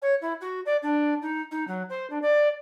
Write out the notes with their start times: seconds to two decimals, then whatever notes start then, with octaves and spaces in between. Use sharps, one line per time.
0.02 C#5
0.21 E4
0.41 F#4
0.65 D5
0.82 D4
1.22 D#4
1.51 D#4
1.67 F#3
1.89 C5
2.10 D4
2.21 D5